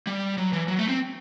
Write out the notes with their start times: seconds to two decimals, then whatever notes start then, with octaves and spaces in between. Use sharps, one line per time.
0.07 G3
0.38 F#3
0.53 E3
0.68 F#3
0.79 A3
0.89 C4